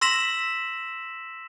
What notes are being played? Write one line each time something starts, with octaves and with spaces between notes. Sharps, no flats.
C6 E6 A#6 B6 E7 F#7